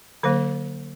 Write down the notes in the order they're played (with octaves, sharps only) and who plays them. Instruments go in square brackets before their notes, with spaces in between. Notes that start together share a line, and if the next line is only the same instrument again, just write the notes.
[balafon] D3 F#3 A#3 C5